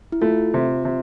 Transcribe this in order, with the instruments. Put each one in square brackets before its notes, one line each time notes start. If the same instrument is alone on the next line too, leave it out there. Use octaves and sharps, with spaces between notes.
[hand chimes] E4
[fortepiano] A3 [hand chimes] F4
[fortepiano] C3
C3